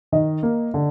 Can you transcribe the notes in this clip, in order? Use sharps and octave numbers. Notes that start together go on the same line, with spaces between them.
D#3 D#5
A#3
D3